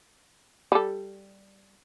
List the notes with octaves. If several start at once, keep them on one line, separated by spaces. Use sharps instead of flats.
G3 A4